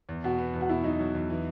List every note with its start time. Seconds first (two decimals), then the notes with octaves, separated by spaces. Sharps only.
0.09 E2
0.24 B2 F#4
0.38 B3
0.54 E2
0.61 F#4
0.69 B2 E4
0.84 F#3 D#4
1.00 F#3
1.15 E2
1.30 E3